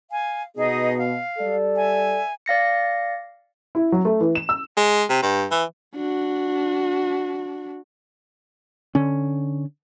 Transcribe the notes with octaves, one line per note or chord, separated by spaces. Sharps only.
F5 G#5
B2 D#4 G#4 D#5
F5
G3 A4 D5
E5 G#5
D5 F5 A#6 C#7
E4
F#3
A3
E3
E7
E6
G#3
C3
G2
E3
D4 F#4
D3 C#4